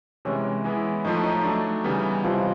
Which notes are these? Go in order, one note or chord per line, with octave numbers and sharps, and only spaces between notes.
C3 E3 G#3 C#4
E3 G#3 B3 E4
A2 F3 A3 D#4
D#4
F#3 A3 D4
C#3 E3 G3 B3
C3 E3 F3 G3 F4
F4